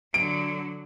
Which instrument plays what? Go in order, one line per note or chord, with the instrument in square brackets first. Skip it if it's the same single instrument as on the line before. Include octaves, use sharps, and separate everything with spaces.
[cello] D3 F#3 [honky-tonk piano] D7